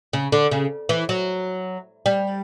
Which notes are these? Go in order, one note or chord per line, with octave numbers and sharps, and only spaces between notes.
C#3
D3
C#3
E3
F#3
G3